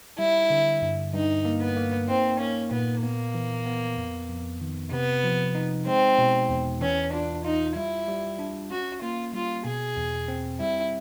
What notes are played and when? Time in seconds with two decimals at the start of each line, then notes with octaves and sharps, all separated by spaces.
0.19 G3 E4
0.50 D3
0.82 G2
1.13 G2 D#4
1.45 A#3
1.60 B3
1.76 A#3
2.08 C4 D#4
2.40 A#3 C#4
2.71 A#2 B3
3.03 A#3 B3
3.34 E3
3.66 B3
3.98 F2
4.29 F2
4.61 D#3
4.92 C3 B3
5.24 F3
5.55 D#4
5.86 G#3 C4
6.19 B2
6.49 E2
6.81 E3 C#4
7.13 D4 F4
7.45 D#4 F4
7.76 G3 E4
8.08 G3
8.39 D4
8.70 C#4 F#4
9.02 A#3 F4
9.34 G3 F4
9.65 B2 G#4
9.97 E2
10.28 C4
10.60 G3 E4